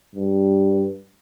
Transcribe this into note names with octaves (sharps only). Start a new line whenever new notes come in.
G2